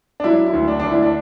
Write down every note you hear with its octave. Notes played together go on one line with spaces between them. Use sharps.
D4
F#3 E4
E4
D2
D4
D2 D4
E4
D4